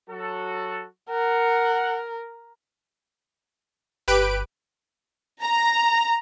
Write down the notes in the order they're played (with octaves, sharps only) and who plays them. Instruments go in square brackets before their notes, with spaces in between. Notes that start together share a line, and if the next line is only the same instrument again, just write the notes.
[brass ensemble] F#3 F#4 A4
[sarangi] A#4 [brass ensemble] F#5
[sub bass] G1 [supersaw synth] G4 B4 D7
[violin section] A#5